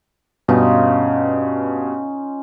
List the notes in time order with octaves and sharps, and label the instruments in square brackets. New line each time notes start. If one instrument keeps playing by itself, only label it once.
[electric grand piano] G2 B2 [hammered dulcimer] C#4 D#4 F4